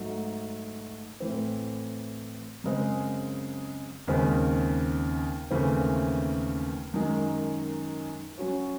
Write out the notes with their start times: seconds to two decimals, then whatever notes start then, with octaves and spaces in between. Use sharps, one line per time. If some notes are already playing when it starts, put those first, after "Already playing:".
Already playing: G#2 F#3 A3
1.20 A2 E3 C4
2.64 F#2 C#3 G#3 C4
4.07 D#2 C#3 G#3 C4
5.51 D#2 C#3 E3 A3 C4
6.94 F#2 D#3 G#3
8.38 F#3 C#4 F#4 C#5